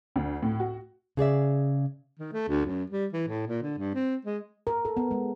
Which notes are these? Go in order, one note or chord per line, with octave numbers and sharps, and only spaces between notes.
D2
A2
F#4
C#3 G#4 D5 E5
D#3
A3
D2
F#2
G3
E3
A2
A#2
D3
G2
C4
G#3
A#4
A4
B3
G#3